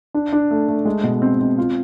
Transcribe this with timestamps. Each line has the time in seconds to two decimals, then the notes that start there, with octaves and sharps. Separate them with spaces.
0.14 D4
0.33 D4
0.51 A3
0.68 A3
0.85 G#3
1.03 B2
1.22 C4
1.40 C4
1.58 F4